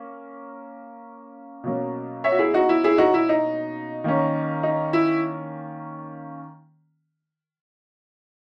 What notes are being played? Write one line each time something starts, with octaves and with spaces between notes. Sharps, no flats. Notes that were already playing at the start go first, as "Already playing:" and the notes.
Already playing: A#3 C#4
B2 F#3 A#3 C#4
C#5 E5
F#4
E4 G#4
D#4 F#4
E4
E4 G#4
D#4 F#4
E4
D#4
D#3 A#3 C#4
D#4
E4